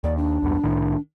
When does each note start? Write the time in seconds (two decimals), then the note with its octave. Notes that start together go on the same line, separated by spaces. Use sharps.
0.04 D#2 D5
0.17 D4
0.42 B1 E2 G2
0.64 C2 A2 D#3